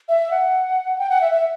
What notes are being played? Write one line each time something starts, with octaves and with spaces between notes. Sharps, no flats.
E5
F#5
G5
F#5
E5
E5